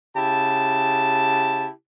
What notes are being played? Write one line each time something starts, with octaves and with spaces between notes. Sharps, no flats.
C#3 E4 G4 A5